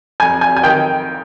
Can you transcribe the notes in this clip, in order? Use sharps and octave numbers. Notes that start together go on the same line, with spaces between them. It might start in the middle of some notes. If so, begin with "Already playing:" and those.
F2 G#5
G#5
G#5
D#3 G5